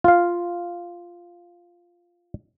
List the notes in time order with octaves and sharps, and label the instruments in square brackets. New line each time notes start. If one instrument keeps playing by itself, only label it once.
[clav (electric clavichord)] F4 F5